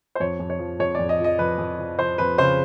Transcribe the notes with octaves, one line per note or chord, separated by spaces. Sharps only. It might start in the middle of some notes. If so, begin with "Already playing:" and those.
C5
F2 C#5
F2
C#5
F3
F2 C#5
F2 D5
D#5
F3 D#5
F2 B4
F2
F3
F3 C5
F2 B4
C#3 C5